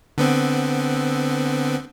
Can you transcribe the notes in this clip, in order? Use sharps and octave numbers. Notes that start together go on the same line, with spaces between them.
D3 B3 C4